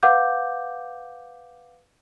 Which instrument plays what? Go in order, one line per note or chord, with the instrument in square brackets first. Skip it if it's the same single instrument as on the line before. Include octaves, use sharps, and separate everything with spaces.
[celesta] B4 F5 F#5 D6 G6